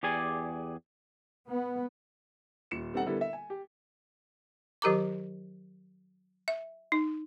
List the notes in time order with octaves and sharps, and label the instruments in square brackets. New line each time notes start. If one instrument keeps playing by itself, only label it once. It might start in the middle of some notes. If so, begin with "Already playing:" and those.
[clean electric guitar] E2 G4 G#4 D5 G#5
[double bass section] B3
[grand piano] D#1 C#7 E7
G3 C4 D#4 A4 F#5
D3 G3 B3 E4 A4 A#4
E5
G#5
G4
[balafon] D#3 F#3 G4 A#4 A#5 D6
E5
D#4